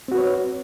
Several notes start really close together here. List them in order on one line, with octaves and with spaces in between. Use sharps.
C4 F#4 B4 C#5